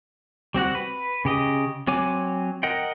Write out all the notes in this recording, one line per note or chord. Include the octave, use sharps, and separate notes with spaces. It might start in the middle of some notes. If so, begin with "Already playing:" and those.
G3 C4 F#4 F#5
B4
C#3 G4 D#5
F#3 C4 C#5 G#5 D6
A#4 D#5 F#5 G5